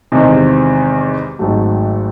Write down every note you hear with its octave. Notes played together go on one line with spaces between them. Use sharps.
E2 C3 D#3 G#3 C4
G#1 G#2 F#3 A3